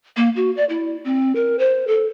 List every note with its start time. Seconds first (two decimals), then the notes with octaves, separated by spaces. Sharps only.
0.17 A#3
0.36 F#4
0.57 D5
0.69 E4
1.05 C4
1.35 A#4
1.59 C5
1.87 A4